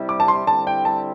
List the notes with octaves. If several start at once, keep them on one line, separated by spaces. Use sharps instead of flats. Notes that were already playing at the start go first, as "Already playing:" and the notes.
Already playing: C3 G3 E4
D6
A5
C6
D3 G3 C4 E4 A5
G5
A5